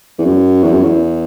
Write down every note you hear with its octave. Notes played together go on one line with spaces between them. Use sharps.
E2
F#2
E2
F#2
E2